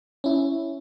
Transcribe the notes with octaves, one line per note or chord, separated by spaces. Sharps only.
C#4 E4